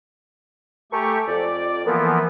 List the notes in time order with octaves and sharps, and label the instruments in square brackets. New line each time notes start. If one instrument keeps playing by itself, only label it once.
[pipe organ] A3 G4 C#6 [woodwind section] A4 G#5 A#5
[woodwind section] F2 [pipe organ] D5
[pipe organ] E3 F3 B3 [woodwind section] A#3